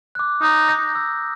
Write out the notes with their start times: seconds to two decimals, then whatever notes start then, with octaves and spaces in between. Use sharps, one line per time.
0.15 D6 F#6
0.42 D#4 A#5
0.68 D#6 G6 A#6
0.95 E6